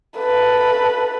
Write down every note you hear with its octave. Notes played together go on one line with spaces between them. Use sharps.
A4 B4